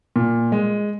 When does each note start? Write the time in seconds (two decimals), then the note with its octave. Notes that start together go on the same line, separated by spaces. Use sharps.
0.16 A#2
0.52 G#3